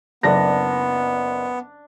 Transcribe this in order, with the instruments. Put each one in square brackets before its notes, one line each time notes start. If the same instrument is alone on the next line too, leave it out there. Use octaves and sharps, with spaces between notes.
[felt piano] F#1 D5 A#6 [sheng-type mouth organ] B3 [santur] D4